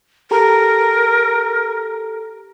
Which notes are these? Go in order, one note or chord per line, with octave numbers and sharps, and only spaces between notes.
G4 A4 A#4 A#5